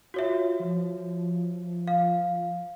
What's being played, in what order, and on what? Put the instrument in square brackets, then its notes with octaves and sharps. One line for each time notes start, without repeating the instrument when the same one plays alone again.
[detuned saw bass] F4 [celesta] F#4 C#5 E5
[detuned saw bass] F3
[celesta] F5